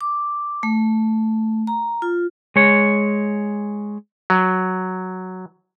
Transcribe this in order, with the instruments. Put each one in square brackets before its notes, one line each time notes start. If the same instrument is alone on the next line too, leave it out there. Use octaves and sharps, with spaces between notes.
[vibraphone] D6
A3
A#5
F4
[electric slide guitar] G#3 C#5
[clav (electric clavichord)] F#3